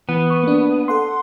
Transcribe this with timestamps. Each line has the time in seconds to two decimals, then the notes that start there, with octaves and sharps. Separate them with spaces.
0.09 E3 B3
0.30 C#6
0.43 A#3 D4
0.88 A4 F#5 C6